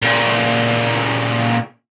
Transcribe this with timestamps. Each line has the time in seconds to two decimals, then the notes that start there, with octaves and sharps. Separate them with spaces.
0.02 A#2 C#3